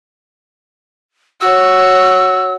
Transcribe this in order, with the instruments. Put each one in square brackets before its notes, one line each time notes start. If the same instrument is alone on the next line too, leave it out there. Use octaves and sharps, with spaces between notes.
[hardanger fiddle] F#4 C#5 [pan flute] E6